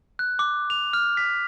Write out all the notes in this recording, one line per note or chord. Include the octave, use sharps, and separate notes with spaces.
F#6
D6
F7
F6
B6